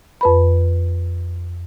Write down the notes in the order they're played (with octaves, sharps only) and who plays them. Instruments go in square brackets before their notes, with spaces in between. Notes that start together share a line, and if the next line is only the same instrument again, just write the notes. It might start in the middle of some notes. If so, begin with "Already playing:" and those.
[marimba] F2 B4 B5